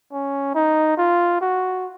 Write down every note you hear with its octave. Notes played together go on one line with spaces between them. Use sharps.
C#4
D#4
F4
F#4